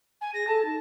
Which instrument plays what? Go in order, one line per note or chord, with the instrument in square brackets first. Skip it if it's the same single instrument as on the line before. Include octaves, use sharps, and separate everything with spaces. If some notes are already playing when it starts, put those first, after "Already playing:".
[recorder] G#5
[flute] G#4 [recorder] A#6
[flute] A4 [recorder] A5
[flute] D#4